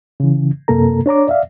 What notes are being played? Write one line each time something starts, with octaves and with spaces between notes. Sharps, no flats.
C#3 E3
F#2 C3 A#3 A4 A#5
D4 C#5 A#5 D6
D5 E5 F5